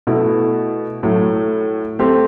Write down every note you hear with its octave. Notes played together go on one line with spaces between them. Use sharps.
B2 A3 E4
A2 F#3 A3
A3 C4 G4 C5